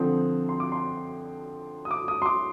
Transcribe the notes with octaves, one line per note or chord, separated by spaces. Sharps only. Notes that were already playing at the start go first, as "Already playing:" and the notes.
Already playing: D3 F3 C4 D#6
C6
D6
C6
D#6
D6
D#6
C6
D6